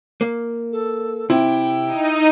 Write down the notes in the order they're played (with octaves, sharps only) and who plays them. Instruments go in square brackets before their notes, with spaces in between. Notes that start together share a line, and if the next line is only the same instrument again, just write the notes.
[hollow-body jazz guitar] A#3
[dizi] A4
[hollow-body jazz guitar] C3 [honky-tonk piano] E4 [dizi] G5
[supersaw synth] D#4 D#7